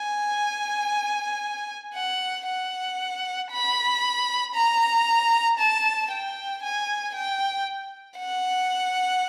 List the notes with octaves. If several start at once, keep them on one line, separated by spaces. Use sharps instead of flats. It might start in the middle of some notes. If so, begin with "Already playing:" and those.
Already playing: G#5
F#5
F#5
B5
A#5
A5
G5
G#5
G5
F#5